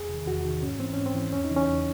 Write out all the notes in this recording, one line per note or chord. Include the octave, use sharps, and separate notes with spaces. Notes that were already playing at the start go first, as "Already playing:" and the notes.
Already playing: E2 G#4
C3
D#3
E2 F#4
C3 D#3
G#2 C#4
E3 C4
G#2 C#4
C4
E3
E2 C#4
D#4
C#3 E3
C#4
E2